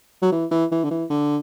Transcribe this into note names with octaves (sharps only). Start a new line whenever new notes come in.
F#3
E3
E3
E3
D3
E3
D3